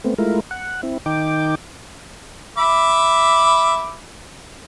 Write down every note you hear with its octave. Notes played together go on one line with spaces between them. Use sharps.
A3 B3 C4
G#3 A3 E4 F4 A#4
F#5
C4 E4
D#3 D#4 G5 D6
E5 B5 D6